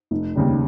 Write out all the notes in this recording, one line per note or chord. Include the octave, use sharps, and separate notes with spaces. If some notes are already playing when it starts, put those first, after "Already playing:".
F1
D#2 C#3 G3